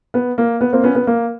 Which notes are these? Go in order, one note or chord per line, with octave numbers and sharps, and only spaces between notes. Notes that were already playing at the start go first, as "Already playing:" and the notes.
B3
A#3
B3
A#3 C4
B3 C#4
B3
A#3